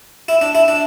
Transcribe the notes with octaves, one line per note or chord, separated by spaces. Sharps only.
E4
D4
E4
D4